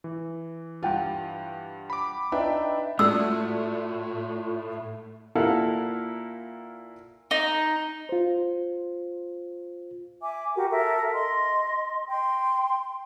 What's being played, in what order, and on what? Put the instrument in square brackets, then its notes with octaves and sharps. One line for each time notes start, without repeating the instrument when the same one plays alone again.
[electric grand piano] E3
[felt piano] G2 F4 [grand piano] F#5 G5
[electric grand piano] B5 D6
[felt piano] D4 [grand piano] D#4 [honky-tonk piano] B4 E5 G5
[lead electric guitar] A2 [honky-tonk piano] A3 F#4 D5 [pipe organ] F4 [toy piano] E6
[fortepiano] A#2 E4 A4 A#4 F5 F#5
[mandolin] D#4
[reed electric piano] F4 C5
[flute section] E5 G#5 D6
F#4 G4 A#4
A4 A#4 E5
D#5 C6
G5 C6